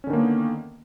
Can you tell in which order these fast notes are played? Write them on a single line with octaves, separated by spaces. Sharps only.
C#4 D3 D#3 A#3 B3